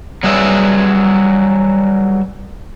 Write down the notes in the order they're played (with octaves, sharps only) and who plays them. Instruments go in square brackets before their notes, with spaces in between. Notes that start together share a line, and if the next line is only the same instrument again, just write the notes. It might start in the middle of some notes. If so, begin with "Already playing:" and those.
[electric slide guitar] F#3 G3 G#4 B4 E5